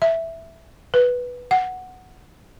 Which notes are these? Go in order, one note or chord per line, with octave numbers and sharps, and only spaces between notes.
E5
B4
F#5